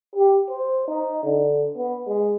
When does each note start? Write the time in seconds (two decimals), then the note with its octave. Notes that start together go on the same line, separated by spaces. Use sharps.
0.16 G4
0.50 C5
0.88 D#4
1.24 D3
1.77 B3
2.07 G#3